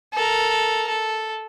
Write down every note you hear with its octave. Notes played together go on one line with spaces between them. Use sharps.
A4 A#4
A4